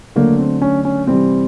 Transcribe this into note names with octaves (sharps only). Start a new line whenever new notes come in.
D3 F#3 A3 A#3
C4
C#4
C#4
C3 E3 G3 C4